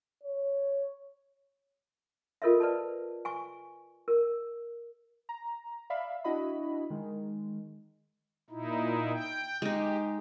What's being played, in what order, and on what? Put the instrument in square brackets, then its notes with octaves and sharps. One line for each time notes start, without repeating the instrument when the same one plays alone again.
[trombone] C#5
[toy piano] F4 A4 A#4 C#5 D#5 E5
B4 D5 A5
G#5 C#6
A#4
[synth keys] A#5
D5 E5 F5 B5
D4 E4 F#4 D#5 B5
D#3 G#3
[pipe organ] A#2 D#4 E4
G5
[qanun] G#3 D#4 [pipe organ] G4